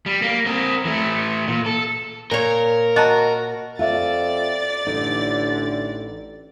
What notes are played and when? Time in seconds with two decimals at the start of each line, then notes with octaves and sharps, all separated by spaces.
0.06 G3
0.22 A#3
0.46 C4 A#4
0.85 E3 A3
1.48 A#2
1.66 A4
2.31 A#2 A#4 C#5
2.96 F#4 D#5 A5 A#5
3.79 F2 F4 D5 E5 A6
4.87 A1 D3 D#4